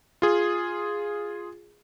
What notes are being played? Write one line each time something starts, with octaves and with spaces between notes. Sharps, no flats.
F4 G#4